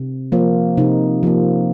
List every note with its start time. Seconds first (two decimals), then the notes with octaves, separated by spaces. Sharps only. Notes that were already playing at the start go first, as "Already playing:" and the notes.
Already playing: C3
0.32 F3 A#3
0.77 C3 D#4
1.23 F3 A#3